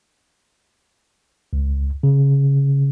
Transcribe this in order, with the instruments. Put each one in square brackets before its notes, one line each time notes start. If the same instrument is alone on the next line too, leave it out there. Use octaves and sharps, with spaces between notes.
[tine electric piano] C#2
C#3